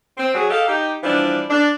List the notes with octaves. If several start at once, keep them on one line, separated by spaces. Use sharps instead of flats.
C4
F#3 G#4
G4 A4 D#5 F5
D#4 G4
E3 F3 G3 D4
D4